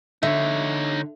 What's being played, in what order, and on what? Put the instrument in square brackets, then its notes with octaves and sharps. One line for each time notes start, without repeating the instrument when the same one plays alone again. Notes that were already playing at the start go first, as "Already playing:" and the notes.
[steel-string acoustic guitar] D3 [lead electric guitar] D#4 C#5 [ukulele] E5